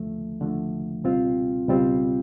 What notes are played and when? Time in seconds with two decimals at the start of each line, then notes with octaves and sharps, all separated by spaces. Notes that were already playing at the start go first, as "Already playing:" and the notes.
Already playing: D#2 D3 F3 A3
0.40 D#2 D3 F3 A3
1.04 C#2 B2 G3 C4 F4
1.68 C#2 B2 G3 C4 F4